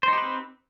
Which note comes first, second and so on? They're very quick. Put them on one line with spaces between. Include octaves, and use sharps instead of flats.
C5 D#4 G4 B4 C4